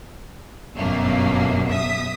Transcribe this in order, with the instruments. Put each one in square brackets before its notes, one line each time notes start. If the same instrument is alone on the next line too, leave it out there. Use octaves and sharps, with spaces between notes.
[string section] G1 A3 A#3 [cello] F#2 B2
[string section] E5 D#6 B6